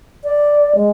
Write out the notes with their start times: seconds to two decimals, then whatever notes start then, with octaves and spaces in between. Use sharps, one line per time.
0.24 D5
0.75 G#3